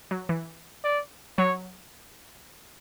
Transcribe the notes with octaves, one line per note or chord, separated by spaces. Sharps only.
F#3
E3
D5
F#3 C#5